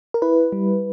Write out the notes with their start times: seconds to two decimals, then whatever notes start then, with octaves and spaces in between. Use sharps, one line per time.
0.14 A#4
0.22 E4 B4
0.52 G3